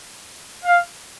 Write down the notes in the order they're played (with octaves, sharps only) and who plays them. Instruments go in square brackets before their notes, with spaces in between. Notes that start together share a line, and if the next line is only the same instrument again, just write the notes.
[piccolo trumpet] F5